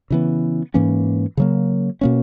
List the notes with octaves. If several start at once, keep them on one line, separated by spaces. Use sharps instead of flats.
C#3 E3 B3
G#2 E3 A#3 C#4
C#3 F#3 A#3
B2 A#3 C#4